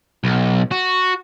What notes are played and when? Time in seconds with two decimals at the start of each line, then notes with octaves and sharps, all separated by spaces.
0.24 B1
0.72 F#4